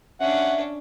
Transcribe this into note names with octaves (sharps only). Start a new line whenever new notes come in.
C#4 D4 E5 F#5